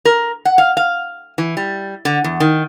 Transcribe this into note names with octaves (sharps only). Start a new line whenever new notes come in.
A#4
F#5
F5
F5
E3
G3
D3
E2
D#3